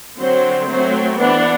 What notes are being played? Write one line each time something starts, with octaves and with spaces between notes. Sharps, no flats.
D3 F#3 C4 C5
F#3 A3 C4 C5
E3 B3 D4 F#5